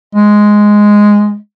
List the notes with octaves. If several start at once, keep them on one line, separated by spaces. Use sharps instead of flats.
G#3